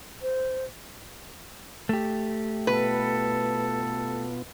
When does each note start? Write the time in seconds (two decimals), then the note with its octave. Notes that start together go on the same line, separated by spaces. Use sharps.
0.22 C5
1.89 A3 G4
2.67 B2 B3 F4 A4 B4